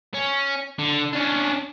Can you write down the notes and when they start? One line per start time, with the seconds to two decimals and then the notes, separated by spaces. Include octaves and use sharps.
0.14 C#4
0.79 D3
1.13 C#4 D4